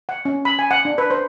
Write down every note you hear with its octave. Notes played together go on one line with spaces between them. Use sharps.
F#5
C#4
B5
G#5
F#5
D4
B4
C5